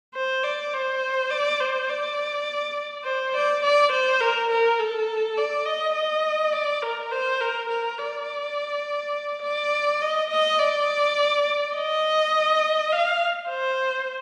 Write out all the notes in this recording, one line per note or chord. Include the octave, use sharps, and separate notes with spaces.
C5
D5
C5
D5
C5
D5
C5
D5
D5
C5
A#4
A#4
A4
D5
D#5
D#5
D5
A#4
C5
A#4
A#4
D5
D5
D#5
D#5
D5
D#5
F5
C5